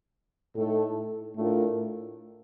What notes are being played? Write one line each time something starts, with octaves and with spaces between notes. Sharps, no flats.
A2 A3 D#4 A4
A2 A3 D4 F4 A#4